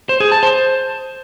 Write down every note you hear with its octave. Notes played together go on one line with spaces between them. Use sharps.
C5
G#4
A5
C5